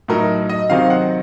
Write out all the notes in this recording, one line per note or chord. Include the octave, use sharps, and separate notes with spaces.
A2 F#3 A3 D#4 A#4
D#5
C3 D#3 F#3 C4 D#4 F5
F#5